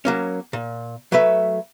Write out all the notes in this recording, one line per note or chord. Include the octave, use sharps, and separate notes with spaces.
F#3 A#3 C#4
A#2
F#3 A3 B4 E5